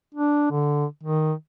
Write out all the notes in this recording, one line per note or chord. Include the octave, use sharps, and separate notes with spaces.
D4
D3
D#3